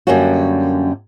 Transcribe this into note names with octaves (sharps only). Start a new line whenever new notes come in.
F#2 D3 G3 A#3 C#4 F#4